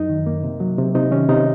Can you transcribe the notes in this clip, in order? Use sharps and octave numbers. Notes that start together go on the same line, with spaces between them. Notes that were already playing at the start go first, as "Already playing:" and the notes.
Already playing: F#2 D#4
D#3
A#3
C3
F#3
C3
C3 D#4
D#3 C#4
C3 D#4